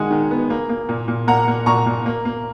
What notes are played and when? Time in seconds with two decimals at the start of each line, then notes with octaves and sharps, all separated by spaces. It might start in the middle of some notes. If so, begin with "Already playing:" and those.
Already playing: D#3 G#3 F#5 G#5
0.11 D#3
0.31 B3
0.50 A#3
0.69 A#3
0.89 A#2
1.08 A#2
1.27 A#3 F#5 A#5
1.48 A#3
1.66 A#2 A#5 C#6
1.86 A#2
2.06 A#3
2.25 A#3